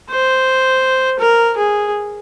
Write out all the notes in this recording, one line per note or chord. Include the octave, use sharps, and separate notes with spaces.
C5
A#4
G#4